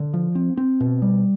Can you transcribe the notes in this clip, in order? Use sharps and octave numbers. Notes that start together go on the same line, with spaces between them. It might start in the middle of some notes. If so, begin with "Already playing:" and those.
Already playing: D3
F3
C4
C4
B2
G3